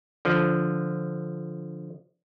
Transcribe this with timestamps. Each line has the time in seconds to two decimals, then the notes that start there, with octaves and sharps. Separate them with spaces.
0.25 D3 F3